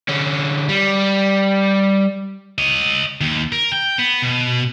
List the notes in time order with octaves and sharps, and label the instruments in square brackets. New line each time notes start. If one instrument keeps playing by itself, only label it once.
[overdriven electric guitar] D3 C#4
G3
[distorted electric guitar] C#5 D#5
D#2
A#4
G5
B3
B2